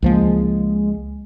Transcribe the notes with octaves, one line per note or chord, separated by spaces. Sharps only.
C#2 F3 G#3 A#3